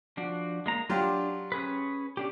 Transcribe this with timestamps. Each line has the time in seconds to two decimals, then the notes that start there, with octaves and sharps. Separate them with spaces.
0.17 F3 D4 F#4
0.66 G#3 A#3 A#5
0.89 F#3 D4 F4 G4
1.52 C#4 G#4 B4
2.17 C#4 D4 G4